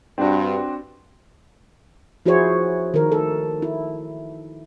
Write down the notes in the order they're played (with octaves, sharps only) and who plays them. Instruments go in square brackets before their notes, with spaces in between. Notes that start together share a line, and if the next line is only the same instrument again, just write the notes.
[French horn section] G2 [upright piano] C4 D4 F#4
[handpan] F3 E4 F#4 G#4 C5 C#5
D#3 A#4
A4
E4